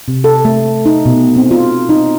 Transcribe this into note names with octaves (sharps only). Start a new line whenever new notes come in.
C3
A4
A3
D#4
B2
C4
F4
D#4